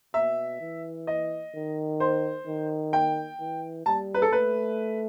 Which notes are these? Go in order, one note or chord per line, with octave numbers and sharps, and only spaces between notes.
B2 E5
E3
D#5
D#3
C5
D#3
G5
E3
G3 A5
B4
A4
A3 B4